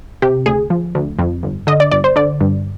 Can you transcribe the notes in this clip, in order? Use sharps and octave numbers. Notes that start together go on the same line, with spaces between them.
C3 G4
D2 G#4
F3
D2
F2
G1
D3 D#5
D5
G1 D5
C5
D3 D5
G2